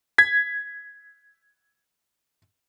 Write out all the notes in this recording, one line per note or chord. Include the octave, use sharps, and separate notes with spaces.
G#6 B6